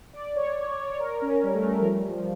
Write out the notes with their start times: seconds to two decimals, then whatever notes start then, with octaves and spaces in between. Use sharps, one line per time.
0.13 D5
0.35 C#5
1.00 A#4
1.22 C#4
1.43 G3
1.54 A3
1.65 A3
1.76 G3
1.80 F3
1.86 G3
2.08 F3